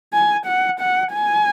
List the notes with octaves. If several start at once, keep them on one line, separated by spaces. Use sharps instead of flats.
G#5
F#5
F#5
G#5